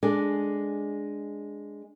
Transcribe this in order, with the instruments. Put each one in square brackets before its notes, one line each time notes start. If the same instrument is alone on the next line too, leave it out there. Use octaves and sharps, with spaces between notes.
[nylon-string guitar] G#3 D4 G#4 A4